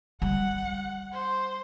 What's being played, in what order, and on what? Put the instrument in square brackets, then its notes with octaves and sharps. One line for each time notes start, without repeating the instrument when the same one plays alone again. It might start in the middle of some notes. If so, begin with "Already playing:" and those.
[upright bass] G3 [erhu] F#5
[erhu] C5